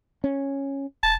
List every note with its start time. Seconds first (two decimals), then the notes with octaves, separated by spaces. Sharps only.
0.24 C#4
1.03 E1 A5